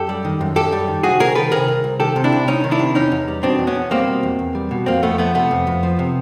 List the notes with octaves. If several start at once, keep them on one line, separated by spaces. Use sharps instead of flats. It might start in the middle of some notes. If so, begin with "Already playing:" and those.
Already playing: F#2 G4 A4
G3
D#3
F#2
F#2 G4 A4
G3
D#3
C2 F#4 G#4
C2 G#4 A#4
D#3 A4 B4
C3 G#4 A#4
C2
C2
D#3 G4 A4
C3
D4 E4
C2
C2 C#4 D#4
D#3
D4 E4
C3
E2 C#4 D#4
E2
G3
B2 C4 D4
E2
B3 C#4
E2
G3 A#3 C4
B2
E2
E2
G3
B2
F2 A#3 C4
F2 A3 B3
F3 A3 B3
C3 A3 B3
F2
F2
F3
C3